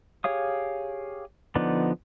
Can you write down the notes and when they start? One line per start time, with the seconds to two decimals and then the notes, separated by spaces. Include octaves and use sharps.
0.24 G4 G#4 C#5 F5 D#6
1.55 D3 F3 B3 D#4 D5